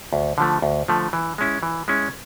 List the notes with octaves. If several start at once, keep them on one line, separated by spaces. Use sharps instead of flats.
D2
D3 F3 A3
D2
D3 F3 A3
E3
G#3 C#4 E4
E3
G#3 C#4 E4